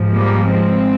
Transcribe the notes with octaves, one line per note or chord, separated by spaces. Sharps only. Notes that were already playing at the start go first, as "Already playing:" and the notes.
Already playing: G#2 F3
G3 A#3
G#3 C4